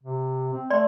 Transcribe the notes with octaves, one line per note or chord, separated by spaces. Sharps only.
C3
C4
A3 D5 C6